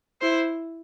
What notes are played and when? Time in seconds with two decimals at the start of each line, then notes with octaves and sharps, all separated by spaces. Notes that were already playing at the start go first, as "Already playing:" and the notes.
0.21 E4 C5